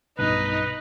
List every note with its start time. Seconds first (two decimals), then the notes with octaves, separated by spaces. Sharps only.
0.19 B1 G2 B2 D#4 B4